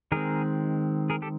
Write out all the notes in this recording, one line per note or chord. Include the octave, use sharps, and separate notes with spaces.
D#3 G#3 C4 G#4 A#4
G#4 A#4
G4 A4